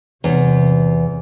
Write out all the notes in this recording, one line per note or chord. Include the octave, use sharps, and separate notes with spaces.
E2 C3